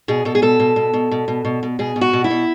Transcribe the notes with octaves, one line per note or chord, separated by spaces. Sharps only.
B2 G#4
B2 A4
G#4
B2 A4
B2
B2
B2
B2
B2
B2
B2
B2 G#4
B2
F#4
B2
E4
B2